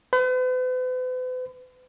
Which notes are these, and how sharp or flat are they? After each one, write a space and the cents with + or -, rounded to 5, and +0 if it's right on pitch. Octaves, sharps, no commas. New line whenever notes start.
B4 +45